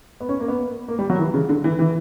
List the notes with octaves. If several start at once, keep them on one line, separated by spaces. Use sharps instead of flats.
B3
C#4
A#3
B3
A#3
G3
F#3
E3
C#3
D3
E3
E3